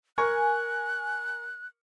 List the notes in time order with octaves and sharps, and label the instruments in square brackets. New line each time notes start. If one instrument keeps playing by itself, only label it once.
[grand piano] A#4 C#6 [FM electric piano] G#5 [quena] F#6